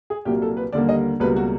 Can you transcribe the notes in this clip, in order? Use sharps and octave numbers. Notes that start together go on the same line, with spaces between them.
G#4
C2 A#2 F#3 A#3 G4
A4
B4
D#2 D3 G3 A#3 D5
D#5
C#2 B2 G3 A#3 B4
F#4